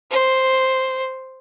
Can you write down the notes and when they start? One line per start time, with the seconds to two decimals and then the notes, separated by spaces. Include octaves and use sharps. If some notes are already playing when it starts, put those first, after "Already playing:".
0.11 C5